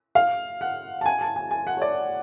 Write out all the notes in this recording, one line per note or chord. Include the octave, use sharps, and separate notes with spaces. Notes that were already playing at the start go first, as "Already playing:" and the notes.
F5
F#5
A5
G#5
A5
G#5
G#5
F#5
C#5
D5